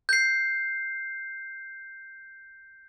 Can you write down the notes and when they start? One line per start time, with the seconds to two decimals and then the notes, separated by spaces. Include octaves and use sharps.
0.09 G6 C7